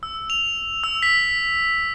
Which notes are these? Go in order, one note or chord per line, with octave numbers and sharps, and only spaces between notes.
E6
F7
E6
B6